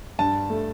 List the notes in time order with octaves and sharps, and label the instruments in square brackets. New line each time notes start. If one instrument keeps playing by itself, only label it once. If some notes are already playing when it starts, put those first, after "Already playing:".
[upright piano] G2 A5
A3